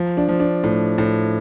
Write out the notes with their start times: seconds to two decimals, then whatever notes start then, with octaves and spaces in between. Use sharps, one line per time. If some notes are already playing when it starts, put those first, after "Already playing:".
Already playing: F3
0.17 D4
0.29 F3
0.40 D4
0.64 A2
0.98 A2